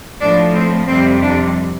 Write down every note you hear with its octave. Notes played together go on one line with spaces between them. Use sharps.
A2 F3 D4
C4
F2 C3 G3 C4
D4